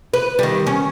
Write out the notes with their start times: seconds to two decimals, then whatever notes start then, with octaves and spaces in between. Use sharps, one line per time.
0.14 B4
0.39 D#3 G3
0.67 C#4